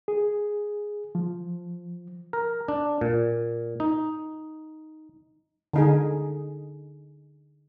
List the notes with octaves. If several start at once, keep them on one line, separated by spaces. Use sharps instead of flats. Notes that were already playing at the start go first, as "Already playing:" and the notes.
G#4
F3
A#4
D4
A#2
D#4
D3 D#4 G#4